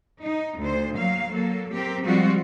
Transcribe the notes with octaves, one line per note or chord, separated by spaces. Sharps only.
D#4
D2 C5
F#3 A#3 F5
F#3 A#3 A4
C4 G4 A#4
F3 G3 G#3 C4 F4 F#4